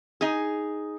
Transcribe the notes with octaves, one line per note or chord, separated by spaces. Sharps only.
D#4 G#4